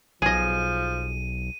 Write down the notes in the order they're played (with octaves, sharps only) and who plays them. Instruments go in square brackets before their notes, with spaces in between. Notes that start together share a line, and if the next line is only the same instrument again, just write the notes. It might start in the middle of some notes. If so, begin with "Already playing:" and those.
[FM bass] B1 [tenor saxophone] F3 [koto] G#4 D#5 [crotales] D#7